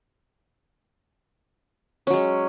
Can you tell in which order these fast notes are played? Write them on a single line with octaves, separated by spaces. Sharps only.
C#4 F#3 G#3